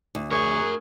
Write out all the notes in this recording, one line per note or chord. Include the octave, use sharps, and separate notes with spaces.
D2
G#4 A#4 C#5 C#6